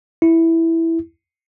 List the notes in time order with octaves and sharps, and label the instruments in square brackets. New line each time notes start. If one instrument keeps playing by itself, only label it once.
[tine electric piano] E4